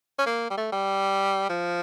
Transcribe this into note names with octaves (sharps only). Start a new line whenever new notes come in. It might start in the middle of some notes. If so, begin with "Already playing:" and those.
C#4
A#3
G3
A3
G3
F3